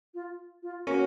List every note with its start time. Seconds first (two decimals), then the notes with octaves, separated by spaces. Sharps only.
0.14 F4
0.63 F4
0.87 A#3 C#4 F#4